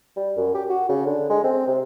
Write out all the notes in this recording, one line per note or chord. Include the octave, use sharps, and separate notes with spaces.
G3
F#2
G4
F#4
C#3
D3
G#3
C4
C3